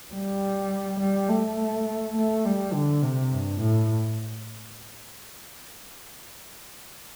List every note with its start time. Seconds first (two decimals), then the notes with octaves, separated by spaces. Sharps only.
0.14 G3
1.00 G3
1.29 A3
2.16 A3
2.45 G3
2.73 D3
3.02 C3
3.31 G2
3.60 A2